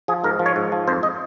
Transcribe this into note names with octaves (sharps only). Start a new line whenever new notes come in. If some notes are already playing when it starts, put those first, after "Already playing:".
F3 G#4
G#2 A#4
F3
C#5
G#2
F3
F2 C5
D#5